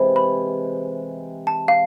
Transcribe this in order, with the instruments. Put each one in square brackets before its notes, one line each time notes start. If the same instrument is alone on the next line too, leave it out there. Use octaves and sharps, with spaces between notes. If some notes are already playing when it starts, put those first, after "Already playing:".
Already playing: [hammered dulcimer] C3 E3 G#3
[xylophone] B5
A5
F5